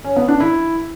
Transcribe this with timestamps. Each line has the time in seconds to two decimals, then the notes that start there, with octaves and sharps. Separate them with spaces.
0.04 C#4
0.16 B3
0.28 D4
0.40 E4